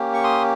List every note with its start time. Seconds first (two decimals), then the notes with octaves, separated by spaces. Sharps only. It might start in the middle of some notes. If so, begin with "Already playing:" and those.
Already playing: A#3 C#4 G4
0.14 C#6
0.24 C6 D#6